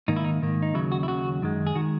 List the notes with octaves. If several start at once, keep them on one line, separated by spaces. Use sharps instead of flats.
G#2 D#3 A#3 D#4
E4
D#4
G#2 D#3 A#3
D#4
D#2 C#3 F#3 E4
F#4
E4
D#2 C#3 F#3 F#4
F#2 D#3 G#3
G#4
D#3 G#3 F#4